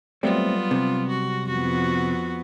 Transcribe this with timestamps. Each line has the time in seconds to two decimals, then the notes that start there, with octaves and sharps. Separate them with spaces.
0.23 F#3 G3 A3 B3 C4 F4
0.71 C3
1.09 F#4
1.48 F2 B3 F#4